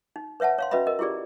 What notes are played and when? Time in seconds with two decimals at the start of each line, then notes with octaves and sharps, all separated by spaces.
0.16 D#4
0.40 B4 C#5 E5 F#5 A5
0.58 C#5 F5 C6
0.71 C#4 F#4 B4 D#5 E5 B5
0.87 A#4 D#5
0.99 E4 F4 G4 G#4 D5